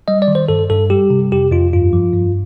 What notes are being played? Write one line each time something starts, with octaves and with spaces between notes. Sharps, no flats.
G3 D#5
D5
D#3
C5
G2 A4
G2 A4
G3 G4
C3
F2 G4
F2 F4
G2 F4
F3
G2